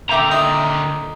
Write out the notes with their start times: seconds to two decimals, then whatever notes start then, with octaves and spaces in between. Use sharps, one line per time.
0.09 A#2 D3 D#3 E5 G5 A#5 D6
0.31 D#4